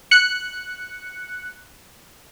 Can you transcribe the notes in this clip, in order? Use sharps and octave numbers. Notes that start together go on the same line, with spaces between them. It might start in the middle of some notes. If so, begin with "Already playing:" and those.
F#6 C#7